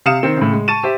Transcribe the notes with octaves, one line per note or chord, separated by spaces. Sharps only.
C3 F5 D#6 C#7 E7
D#3 C4
A2 C#3
G#3
A5 C#6 A6 D#7 E7
G4 C5 E5